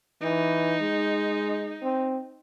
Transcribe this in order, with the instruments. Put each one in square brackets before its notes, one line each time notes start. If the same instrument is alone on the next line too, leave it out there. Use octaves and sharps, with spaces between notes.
[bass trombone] E3 [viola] D#4
[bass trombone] G#3
C4